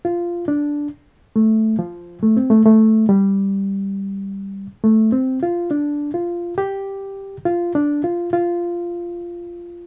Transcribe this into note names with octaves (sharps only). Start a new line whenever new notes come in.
F4
D4
A3
F3
A3
C4
A3
A3
G3
A3
C4
F4
D4
F4
G4
F4
D4
F4
F4